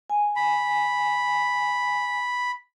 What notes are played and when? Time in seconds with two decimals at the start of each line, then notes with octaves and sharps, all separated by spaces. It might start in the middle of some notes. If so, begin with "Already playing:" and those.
0.10 G#5
0.36 B5